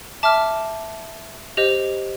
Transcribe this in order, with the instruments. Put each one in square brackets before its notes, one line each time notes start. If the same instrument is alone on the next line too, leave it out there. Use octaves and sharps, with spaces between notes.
[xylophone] E5 A5 D6 F6
G4 C5 D#5